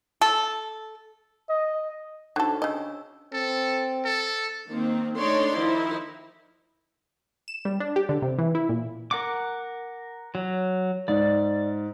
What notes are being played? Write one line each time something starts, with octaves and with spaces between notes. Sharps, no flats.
A4
D#5
D3 D4 D#4 F#4 A4
C#3 D4 D#5 E6
C4 A4
A4
D#3 A#3 C4
A3 D4 D#4 C#5 D5 C6
D#3 F3 D#4 E4
E7
G3
D4
G4
D3
C3
E3
E4
A#2
A#4 F#5 D6
F#3
G#2 D5